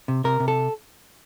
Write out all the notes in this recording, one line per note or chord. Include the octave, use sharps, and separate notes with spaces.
C3
C3 A#4
C3
A4